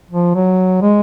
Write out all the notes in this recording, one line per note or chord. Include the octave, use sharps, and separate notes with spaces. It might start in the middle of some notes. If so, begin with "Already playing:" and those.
F3
F#3
G#3